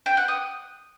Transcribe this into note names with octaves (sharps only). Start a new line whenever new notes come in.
G5
F#5
D#6